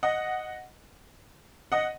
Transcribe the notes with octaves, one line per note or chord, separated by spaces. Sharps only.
D#5 F#5
D#5 F#5